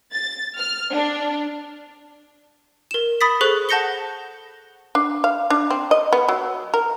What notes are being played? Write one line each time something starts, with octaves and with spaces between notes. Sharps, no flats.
A6
F6
D4
A#4 E7
B5 D#6 A6 B6
G#4 A4 C5 C#6 F#6
F#5 A5 G6 A#6 C#7 G7
D4
F5
D4
C4
D#5
B3
F#3
A#4